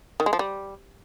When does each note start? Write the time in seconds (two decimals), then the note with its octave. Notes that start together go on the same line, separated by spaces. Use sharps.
0.20 D#3
0.26 G#3
0.33 F3
0.39 G3